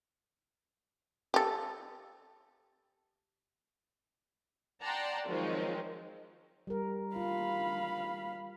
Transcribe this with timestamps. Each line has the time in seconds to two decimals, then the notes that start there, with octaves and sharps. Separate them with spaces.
1.34 G4 A4
4.82 D5 F#5 G5 A5 A#5 C6
5.27 D#3 F3 F#3 G#3 C4 D#4
6.67 G3 A#4
7.16 F4 F5 B5